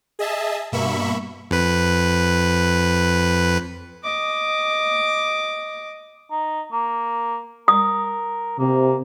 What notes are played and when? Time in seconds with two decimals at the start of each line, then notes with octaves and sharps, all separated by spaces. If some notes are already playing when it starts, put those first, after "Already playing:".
0.19 G#4 D#5 E5 A5
0.72 G2 B2 A#3 E5 B5 C#6
1.51 F2 B4
4.04 D#5 D6
6.31 D#4
6.72 A#3
7.68 A#4 D#6
8.59 C3 A#3